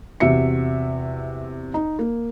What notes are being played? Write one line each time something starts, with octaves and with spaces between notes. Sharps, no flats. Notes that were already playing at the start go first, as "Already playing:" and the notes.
E2 C3 F#4 E5 C#7
D#4
A#3